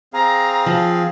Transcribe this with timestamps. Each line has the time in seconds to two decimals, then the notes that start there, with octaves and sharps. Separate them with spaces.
0.14 C4 G#4 F5 A#5
0.66 F3